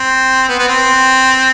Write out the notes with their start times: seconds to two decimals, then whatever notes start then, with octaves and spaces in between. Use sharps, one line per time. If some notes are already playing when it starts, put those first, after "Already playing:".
Already playing: C4
0.48 B3
0.59 B3
0.67 C4